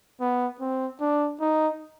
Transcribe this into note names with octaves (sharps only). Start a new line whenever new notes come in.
B3
C4
D4
D#4